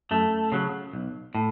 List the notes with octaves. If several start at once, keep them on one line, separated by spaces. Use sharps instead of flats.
F#2 A3
C#3 F#3
B1
A2